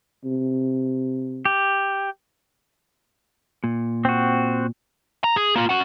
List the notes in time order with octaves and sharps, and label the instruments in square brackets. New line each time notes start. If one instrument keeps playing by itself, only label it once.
[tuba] C3
[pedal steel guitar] G4
[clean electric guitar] A#2
[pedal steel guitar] C4 F#4
[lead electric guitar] A#5
G#4
A#3 F4
C#4 F#5